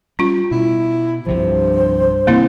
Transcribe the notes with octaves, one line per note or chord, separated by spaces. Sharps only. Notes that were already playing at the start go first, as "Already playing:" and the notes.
G3 C#4 F4
B2 E4
C2 G2 C3 F3 C5
D#2 C3 E3 A#3 C4 E4